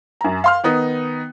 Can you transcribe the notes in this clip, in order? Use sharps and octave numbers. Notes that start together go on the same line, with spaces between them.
F#2 A#5
F5 C6 F6
D#3 B3 D#4